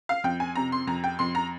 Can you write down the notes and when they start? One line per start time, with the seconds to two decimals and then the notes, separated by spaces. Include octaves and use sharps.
0.09 F5
0.24 F2 G5
0.40 G#5
0.55 C3 A#5
0.72 C6
0.87 F2 A#5
1.04 G5
1.19 F2 C6
1.35 A#5